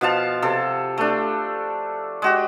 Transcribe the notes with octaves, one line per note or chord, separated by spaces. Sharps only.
B2 F3 F5 A5
C3 A4
A3 D4
G#3 F#4 G4